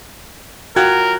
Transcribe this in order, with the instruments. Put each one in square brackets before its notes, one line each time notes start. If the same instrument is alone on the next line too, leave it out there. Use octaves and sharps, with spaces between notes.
[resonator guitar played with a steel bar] F#3 F4 G5 [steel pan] F#4 [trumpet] A#4 [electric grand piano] F#6 G#6